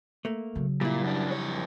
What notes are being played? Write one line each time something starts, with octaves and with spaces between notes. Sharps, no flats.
A3 A#3
C#3 F#3
A#2 G3 E4
F#2 D4
F2 C#5